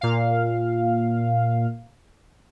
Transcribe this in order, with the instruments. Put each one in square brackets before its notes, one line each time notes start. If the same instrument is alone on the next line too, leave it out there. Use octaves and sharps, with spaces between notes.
[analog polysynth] A#2 F5